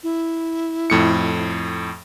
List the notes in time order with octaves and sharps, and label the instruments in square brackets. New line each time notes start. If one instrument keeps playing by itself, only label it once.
[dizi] E4
[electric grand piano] F2 A2 C#7